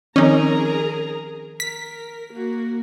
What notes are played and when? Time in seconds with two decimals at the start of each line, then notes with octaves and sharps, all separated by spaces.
0.16 D#3 F3 C4 C#4 D#4 G#4 A#4 A#5
1.60 A#4 B6
2.33 A#3 F#4